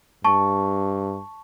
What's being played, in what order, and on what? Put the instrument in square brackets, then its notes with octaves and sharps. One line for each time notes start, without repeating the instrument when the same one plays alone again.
[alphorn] G2 [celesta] A5 C#6